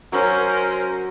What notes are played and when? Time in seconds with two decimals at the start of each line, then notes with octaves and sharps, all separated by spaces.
0.12 F#3 C#4 A#4 C5